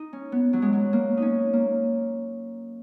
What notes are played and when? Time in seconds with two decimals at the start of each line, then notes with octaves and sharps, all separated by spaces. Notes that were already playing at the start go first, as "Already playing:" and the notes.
Already playing: D#4
0.13 C#4
0.32 B3
0.53 F#3
0.62 G#3
0.73 F#3
0.93 A#3
1.17 C#4 D#4
1.53 A#3